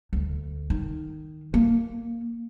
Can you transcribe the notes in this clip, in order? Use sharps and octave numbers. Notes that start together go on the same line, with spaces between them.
D2
D#3
A#3